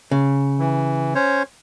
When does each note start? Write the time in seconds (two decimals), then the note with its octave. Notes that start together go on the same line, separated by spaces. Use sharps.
0.11 C#3
0.59 E3
1.15 C#4 C5 C#5